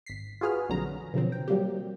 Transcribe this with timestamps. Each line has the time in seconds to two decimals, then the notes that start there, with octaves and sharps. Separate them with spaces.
0.06 G#1 B6 C7
0.41 F4 F#4 G#4 B4 F6
0.69 A#1 F2 D3 F#3 A#5
1.13 B2 D3 F3 F#3 C4
1.32 G5
1.48 F#3 G3 A#3 C4 G4